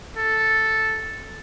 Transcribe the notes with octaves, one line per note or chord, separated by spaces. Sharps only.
A4